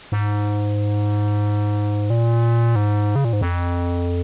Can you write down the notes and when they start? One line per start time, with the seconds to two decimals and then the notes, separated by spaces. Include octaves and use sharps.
0.12 G#2
2.10 A#2
2.76 G#2
3.16 C#3
3.25 A#2
3.33 G#2
3.41 F2